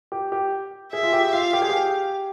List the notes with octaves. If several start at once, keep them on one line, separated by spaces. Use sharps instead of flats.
G4
G4
G#4 E5
F4
G4
F4 F5
G4
G#4
G4